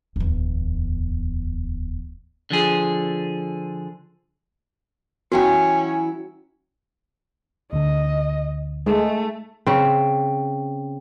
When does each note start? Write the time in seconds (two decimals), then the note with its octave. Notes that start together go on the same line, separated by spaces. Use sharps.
0.16 D1 E2
2.51 D3 F3 G#4
5.32 E3 F#3 C#4 E4 F#4 G5
7.73 D2 D3 D#5
8.86 G#3 A3
9.67 C#3 C4